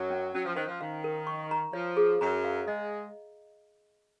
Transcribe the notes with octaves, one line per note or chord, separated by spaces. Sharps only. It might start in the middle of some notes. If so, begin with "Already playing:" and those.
Already playing: F#2 F#3
C#4
F#3 C#4
F3
D#3 C5
F3
D#3 F5
A#4
C#6
A#5
F3 C#5
G#4
F#2 F#3 A#5
F5
G#3 D#5